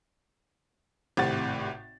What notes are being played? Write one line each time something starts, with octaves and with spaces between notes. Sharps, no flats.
G#1 A2 C3 F#5 A6